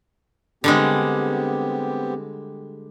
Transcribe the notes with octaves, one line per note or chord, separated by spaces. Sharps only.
D3 G3 G#3 B3 C4 G4